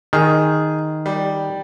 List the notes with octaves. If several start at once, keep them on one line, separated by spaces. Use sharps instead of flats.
D#3 G#4
G3